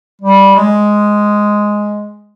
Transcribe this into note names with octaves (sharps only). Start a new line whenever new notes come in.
G3
G#3